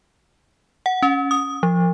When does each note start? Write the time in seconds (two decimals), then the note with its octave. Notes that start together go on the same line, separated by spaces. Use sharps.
0.86 F#5
1.02 C#4
1.31 D#6
1.63 F3